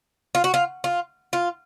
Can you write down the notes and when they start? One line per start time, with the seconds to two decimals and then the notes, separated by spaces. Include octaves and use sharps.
0.35 F4
0.44 F#4
0.54 F4
0.84 F4
1.33 F4